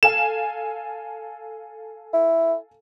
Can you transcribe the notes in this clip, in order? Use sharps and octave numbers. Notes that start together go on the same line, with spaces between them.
A4 F5 G#5 E7
E4